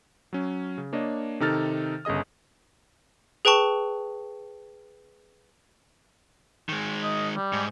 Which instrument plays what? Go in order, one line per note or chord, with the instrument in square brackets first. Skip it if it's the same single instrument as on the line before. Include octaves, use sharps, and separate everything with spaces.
[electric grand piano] F#3 C#4
C#3
A#3 D4 C#5 D#5
C3 D#3 D#4 A4 F6 A6
G1 C#3 G#4 D#5 D#6
[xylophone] G#4 B4 G5 A5 C#6
[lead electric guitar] D#3 G#3
[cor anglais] D#5
G3
[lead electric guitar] G#2